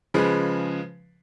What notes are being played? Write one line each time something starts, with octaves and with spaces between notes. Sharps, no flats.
C#3 F3 G#3 B4